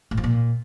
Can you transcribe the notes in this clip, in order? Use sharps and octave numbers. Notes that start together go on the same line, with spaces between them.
A2
F3
A#2